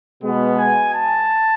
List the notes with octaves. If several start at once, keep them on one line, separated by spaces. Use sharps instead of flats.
B2 G#3 B3
G#5
A5